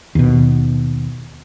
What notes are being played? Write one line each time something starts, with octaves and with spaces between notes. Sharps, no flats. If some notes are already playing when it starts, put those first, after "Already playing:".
D#2 B2